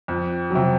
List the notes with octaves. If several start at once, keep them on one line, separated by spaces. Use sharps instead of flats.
F2
C3 F#3